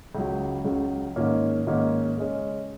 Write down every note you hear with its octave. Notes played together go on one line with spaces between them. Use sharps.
C#2 C#3 F#3
C#2 C#3 F#3
G#2 D#3 A#3 C#4
G#2 D#3 A#3 C#4
C#3 G#3 C#4